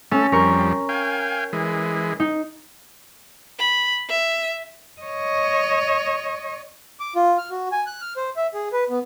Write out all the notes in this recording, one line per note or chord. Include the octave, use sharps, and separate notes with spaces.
A3 C#4 A4
F2 G3 A#4 C#6
F5 G5 G#5
E3 G#3
D#4
B5
E5
C#5 D#5
D6
F4
F6
F#4
G#5
F#6
F6
C5
E5
G#4
B4
B3